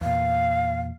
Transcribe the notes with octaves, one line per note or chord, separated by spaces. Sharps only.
E2 A#2 F5